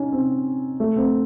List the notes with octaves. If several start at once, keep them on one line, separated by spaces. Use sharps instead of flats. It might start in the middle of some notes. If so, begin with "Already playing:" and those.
Already playing: C#4 D#4
C4
A3
C4